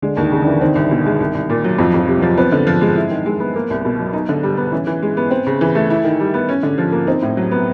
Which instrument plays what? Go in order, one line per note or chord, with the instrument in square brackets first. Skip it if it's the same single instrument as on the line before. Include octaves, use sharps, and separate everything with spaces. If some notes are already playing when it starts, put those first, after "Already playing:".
[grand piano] D3 [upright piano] G#3
[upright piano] D#2 [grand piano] D#3
[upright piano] C#3
[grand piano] D3 [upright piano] E3
[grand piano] D#3 [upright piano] C4
[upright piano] C2
B2
G#3
C2
C2
A#2
F#3
[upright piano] F2 [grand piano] F3
[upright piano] F2 [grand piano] F3
[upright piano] C3
[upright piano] F3 [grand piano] F#3
[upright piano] B3 [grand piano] C4
[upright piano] D3
F3
G#3
E4
D#3
G#3
B3
A#3
C2
B2
F#3
D#4
D3
G3
B3
[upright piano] E3 [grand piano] C#4
[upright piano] E3
G#3
B3
C4
C#3
E3
A3
E4
D#3
G3
B3
C#4
D3
F3
A#3
[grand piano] C4 [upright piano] D#4
[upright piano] A2
F#3
B3